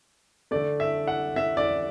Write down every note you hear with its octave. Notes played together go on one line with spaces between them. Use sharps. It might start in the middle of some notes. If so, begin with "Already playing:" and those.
D3 A3 D5
E5
F#5
E5
D5